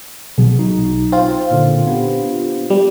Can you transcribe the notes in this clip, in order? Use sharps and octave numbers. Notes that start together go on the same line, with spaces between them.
B1 B3 G#4
D#4 F#4
C4 F4
A#2 D3
B3 D4 G4
G3